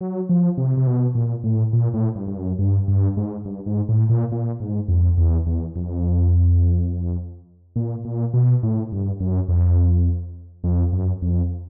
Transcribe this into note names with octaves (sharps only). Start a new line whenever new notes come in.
F#3
F3
C3
C3
B2
A#2
A2
A#2
A2
G2
G2
F#2
G2
G2
G#2
G2
G#2
A2
A#2
A#2
G#2
F2
E2
E2
F2
A#2
A#2
B2
A2
G2
F#2
F2
F2
F#2
F2